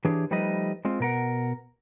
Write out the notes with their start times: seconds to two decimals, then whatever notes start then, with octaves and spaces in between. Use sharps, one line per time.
0.05 E3 D4 G4 G#4 C#5
0.31 F3 G3 A3 D#4 B4 D#5
0.85 G#3 C4 F4
1.00 B2 A#4 F#5